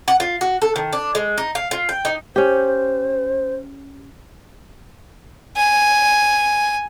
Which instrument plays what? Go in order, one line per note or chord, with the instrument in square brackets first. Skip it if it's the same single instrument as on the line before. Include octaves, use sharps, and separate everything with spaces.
[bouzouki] F#5
F4
F#4
A4
D#3
D4
G#3
D#4
F5
F4
G5
D#4
[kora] C#4 G4 [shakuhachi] C5
[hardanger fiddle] G#5